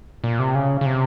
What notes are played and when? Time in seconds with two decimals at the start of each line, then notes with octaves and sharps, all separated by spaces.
0.24 A#2
0.39 C3
0.55 C#3
0.81 C#3
0.86 C3